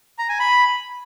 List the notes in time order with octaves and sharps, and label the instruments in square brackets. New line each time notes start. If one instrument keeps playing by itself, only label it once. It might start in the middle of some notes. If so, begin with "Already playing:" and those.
[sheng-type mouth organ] A#5
G#5
B5